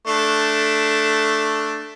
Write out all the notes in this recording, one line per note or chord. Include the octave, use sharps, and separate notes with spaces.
A3 D4